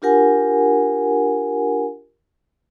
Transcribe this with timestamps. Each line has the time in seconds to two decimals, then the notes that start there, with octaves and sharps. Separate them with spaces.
0.02 D4 F4 G4 A#4 F#5 G#5